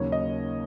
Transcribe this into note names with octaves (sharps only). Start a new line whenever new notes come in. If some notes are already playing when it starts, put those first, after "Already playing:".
Already playing: D#2 C#3 F#3 A#3 C#5
D#5